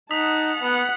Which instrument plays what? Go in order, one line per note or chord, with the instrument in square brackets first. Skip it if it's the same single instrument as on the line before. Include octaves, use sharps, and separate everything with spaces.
[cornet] D#4 [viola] F#5 A5 [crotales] D#6 B6 F7
[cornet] B3 [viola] F#5